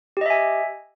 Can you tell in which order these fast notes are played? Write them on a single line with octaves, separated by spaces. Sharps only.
G4 D#5 E5 G#5